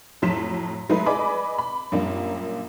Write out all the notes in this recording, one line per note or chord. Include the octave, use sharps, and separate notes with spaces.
F2 A2 F#3 C6 B6 E7
F#3 G#3 A3 E4 A4 B4
G#4 B4 D5 D#5 B5 D6
B5
F#2 A#2 G3 A#3 D4